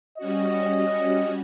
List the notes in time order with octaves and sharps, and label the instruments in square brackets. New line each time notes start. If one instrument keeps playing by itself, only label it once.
[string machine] G3 C#4 F#4 [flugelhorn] D#5